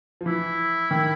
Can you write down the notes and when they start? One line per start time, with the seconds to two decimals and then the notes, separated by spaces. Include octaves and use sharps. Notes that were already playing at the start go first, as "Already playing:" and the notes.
0.21 F3
0.26 E3 E4
0.91 D#3